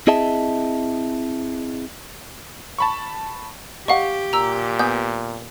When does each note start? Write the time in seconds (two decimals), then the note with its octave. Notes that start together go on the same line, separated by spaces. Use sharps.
0.07 C4 E4 G#4 D#5 E5 A5
2.78 A5 B5 C#6
3.88 G4 D#5 F5 F#5 C#6
4.33 A#2 A#5 E6
4.79 B3 B4 G#5 G6